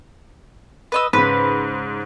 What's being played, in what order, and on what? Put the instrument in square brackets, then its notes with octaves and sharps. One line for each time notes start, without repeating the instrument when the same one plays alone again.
[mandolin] B4 D#5 E6
[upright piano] G#2 C#3 [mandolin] B4